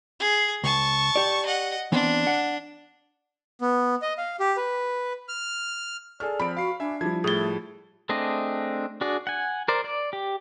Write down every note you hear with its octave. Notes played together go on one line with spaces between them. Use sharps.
G#4
C#2 A5 C#6
G4 D5
D#5 F#5
E3 B3 C4 D4
F#5
B3
D#5
F5
G4
B4
F6
G#4 A4 D5 F6
F3 C4 B5 D7
F#4 F5 C7
D4 E5 G#5
F3 G3 E4 G#6
A2 A3 E4 G#4 A6 G7
A3 C4 D4 G#4 D#5
D4 F#4 G#4 D5
F#5 G#5
A#4 C5 D5
D5
G4